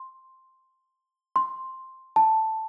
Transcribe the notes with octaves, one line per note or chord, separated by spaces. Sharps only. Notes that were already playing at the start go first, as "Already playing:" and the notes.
Already playing: C6
C6
A5